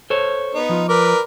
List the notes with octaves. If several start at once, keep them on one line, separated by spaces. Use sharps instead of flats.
A4 C5 C#5
B3 D#4
F3 F4
A#4 B4 D5